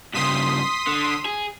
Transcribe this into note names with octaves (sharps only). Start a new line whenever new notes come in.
G2 C#3 C6 D#6 B6
D3
G#4